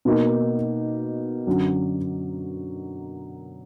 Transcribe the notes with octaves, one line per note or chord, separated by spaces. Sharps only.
B2 A#3 D#4
F#2 D3 F#3